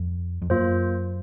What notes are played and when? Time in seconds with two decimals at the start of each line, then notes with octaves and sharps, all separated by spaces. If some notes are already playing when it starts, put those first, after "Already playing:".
Already playing: F2
0.42 F2
0.50 F#2 A#3 F4 C5